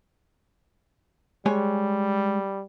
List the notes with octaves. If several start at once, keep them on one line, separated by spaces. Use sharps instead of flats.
G3 G#3 C#5 G#5